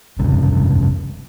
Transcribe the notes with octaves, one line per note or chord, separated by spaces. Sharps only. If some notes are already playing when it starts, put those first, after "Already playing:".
F1 C2 G2 C#3